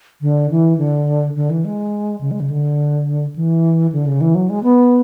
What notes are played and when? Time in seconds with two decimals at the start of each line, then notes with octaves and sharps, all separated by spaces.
0.21 D3
0.50 E3
0.78 D3
1.36 D3
1.50 E3
1.65 G#3
2.21 C#3
2.31 G#3
2.40 C#3
2.50 D3
3.35 E3
3.92 D3
4.06 C#3
4.21 E3
4.35 F#3
4.49 G#3
4.63 B3